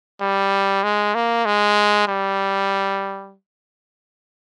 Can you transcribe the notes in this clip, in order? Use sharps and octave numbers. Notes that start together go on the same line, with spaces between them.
G3
G#3
A#3
G#3
G3